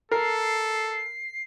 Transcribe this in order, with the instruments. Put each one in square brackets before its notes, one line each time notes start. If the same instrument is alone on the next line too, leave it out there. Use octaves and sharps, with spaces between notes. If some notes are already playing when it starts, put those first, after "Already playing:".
[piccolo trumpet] A4 [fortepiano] A#4 [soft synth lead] C7